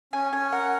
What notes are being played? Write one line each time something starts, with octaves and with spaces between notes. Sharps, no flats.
C#4 G#5
C#4 G#5
A#4 F#5